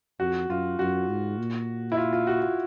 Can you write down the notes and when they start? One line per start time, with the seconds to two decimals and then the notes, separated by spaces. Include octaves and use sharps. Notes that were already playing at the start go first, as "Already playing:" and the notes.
0.20 F2 F#4
0.49 F#2 F4
0.79 F#2 F#4
1.09 G#2
1.38 A#2
1.92 E4
1.97 F4
2.13 F4
2.27 F#4
2.42 F#4